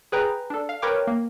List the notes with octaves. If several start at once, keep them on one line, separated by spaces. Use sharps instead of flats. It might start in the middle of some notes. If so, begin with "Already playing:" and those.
G#4 B4 G5 A#5
D4 A4
F5
A#4 B4 C#5 G5 D6 F6
A#3